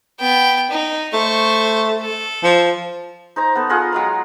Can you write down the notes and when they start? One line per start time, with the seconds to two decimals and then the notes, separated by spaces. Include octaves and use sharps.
0.19 B3 G5
0.70 D#4
1.13 A3 C5 C#6
2.01 A4
2.44 F3
3.36 D#4 C5 A#5
3.55 B3 A4
3.70 F4 G#4 D#5 F#5
3.93 F#3 G#3 A#5